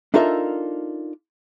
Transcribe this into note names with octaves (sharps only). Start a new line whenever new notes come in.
D4 D#4 F4 A4 A#4 E5